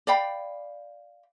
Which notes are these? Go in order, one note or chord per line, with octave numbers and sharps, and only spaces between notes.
D5 F5 G5 B5